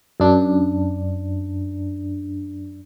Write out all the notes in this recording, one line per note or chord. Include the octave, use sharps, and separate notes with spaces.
F#2 D4